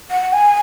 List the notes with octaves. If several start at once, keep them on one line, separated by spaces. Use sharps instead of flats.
F#5
G#5